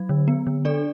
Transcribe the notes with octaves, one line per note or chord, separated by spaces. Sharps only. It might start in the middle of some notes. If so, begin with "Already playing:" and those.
Already playing: F#3
D3
B3
D3
D4 A4 D5